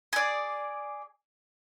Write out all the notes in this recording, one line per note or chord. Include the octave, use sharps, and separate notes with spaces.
G#4 D5